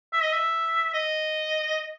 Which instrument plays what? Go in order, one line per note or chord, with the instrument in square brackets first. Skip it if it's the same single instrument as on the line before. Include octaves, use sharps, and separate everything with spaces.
[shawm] E5
D#5
E5
D#5